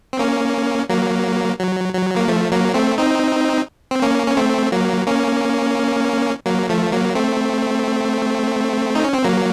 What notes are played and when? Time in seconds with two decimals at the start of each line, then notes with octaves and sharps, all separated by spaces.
0.13 C4
0.19 A#3 C#4
0.89 F#3 A#3
1.59 F#3
1.94 F#3
2.16 A#3
2.28 F3 A3
2.52 F#3 A#3
2.74 A3 C4
2.98 C4 D#4
3.91 C4
4.02 A#3 C#4
4.27 C#4
4.37 A3 C4
4.72 F#3 A#3
5.07 A#3 C#4
6.46 F#3 A#3
6.69 F3 A3
6.92 F#3 A#3
7.15 A3 C4
8.95 D#4
9.04 C#4
9.14 C4
9.24 F#3 A#3